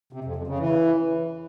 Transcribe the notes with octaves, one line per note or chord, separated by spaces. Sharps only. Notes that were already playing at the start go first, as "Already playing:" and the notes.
C3
F2
F2
C#3
E3